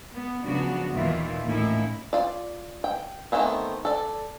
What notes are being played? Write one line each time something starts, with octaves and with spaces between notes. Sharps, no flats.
B3
C#3 F3 F#3 B3 D4 F#4
D#2 A#2 D#3 E3 F4 E5
A2 A#3 C#4 D#4 E4
F4 D5
G5
D#3 F3 A3 B3 C4
A4 D5